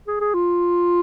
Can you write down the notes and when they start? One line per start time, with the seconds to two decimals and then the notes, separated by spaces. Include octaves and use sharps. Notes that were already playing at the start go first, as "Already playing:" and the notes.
0.07 G#4
0.20 G#4
0.34 F4